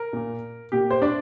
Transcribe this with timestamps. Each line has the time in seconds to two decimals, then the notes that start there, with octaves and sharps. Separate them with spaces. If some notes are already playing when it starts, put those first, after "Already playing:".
Already playing: A#4
0.13 A#2 A#3
0.72 A#2 A#3 G4
0.91 C5
1.02 D4 D5